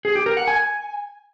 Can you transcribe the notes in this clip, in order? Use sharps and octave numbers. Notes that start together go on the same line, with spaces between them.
G#4
G4
A#4
F#5
G#5